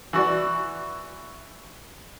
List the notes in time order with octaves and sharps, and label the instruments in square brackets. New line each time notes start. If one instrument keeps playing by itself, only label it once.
[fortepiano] E3 F#4 D5